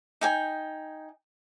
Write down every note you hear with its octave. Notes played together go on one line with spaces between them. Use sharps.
D#4 G5 G#5